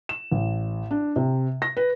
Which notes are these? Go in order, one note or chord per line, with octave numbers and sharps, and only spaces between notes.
E7
A1
D4
C3
A#6
B4